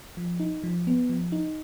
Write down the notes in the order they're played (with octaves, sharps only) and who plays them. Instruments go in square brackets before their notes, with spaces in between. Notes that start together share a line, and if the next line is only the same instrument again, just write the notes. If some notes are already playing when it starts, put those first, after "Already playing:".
[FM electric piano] F3
D#4
F3
B3
F3
D#4